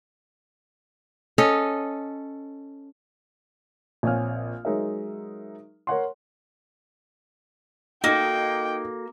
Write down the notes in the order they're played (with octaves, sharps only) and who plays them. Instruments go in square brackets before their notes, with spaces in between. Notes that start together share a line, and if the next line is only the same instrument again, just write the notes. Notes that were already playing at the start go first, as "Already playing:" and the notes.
[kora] C#4 A4 D#5
[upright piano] A#1 C4 C#5 F5 G#5 F6
F#3 G#3 D#4 G#4 A#4 E5
A#4 C#5 F#5 C6
[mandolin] A#3 [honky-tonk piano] D#4 [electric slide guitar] F#4 A4 [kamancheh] G5